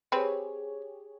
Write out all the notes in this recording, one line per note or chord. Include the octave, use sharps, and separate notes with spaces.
C4 G4 G#4 B4 C#5